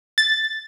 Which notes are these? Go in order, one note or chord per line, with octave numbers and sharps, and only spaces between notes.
A6